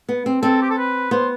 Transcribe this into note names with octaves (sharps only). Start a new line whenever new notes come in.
B3
C4
C4 A4
G4
A4
B4
B3 C5